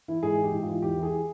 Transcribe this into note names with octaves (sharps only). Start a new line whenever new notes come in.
E3 E4
G#2 G#4
E3
G4
G#2
F4
E3
E2 G4
E3
G#4